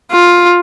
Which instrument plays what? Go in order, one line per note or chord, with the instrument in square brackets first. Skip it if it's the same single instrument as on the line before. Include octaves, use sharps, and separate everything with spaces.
[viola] F4